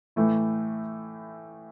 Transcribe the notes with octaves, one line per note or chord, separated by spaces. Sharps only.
A2 E3 A3 E4